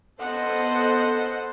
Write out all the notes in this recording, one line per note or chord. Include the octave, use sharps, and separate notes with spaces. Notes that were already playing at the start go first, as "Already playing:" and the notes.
B3 A4 C5 D#5 F#5